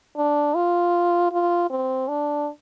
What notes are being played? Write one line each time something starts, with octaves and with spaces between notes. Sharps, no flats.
D4
F4
F4
C4
D4